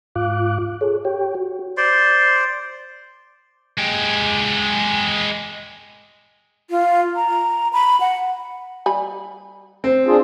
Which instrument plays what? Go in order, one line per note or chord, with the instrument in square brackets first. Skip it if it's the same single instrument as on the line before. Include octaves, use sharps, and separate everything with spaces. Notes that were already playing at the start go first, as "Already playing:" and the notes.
[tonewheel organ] G#2 F4 F5 D6 F#6
G#4 A4 C#5
G4 C#5 G5
F#4
[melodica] C5 D5 C6
[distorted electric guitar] G#3 G4
[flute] F4
A#5
B5
F#5
[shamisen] G3 G#5 B5
[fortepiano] C4
[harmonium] D4 G#4 [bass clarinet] F4